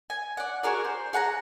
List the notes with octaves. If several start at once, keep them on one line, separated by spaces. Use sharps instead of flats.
G#5
D5 F#5
F#4 G#4 A#4 D5
C5
G#4 F#5 A5 A#5